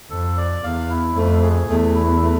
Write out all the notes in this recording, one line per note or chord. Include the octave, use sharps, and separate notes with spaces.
F2 A4
D5
E2 F5
E4
F2 A3
G#4
E2 A3
E4
A3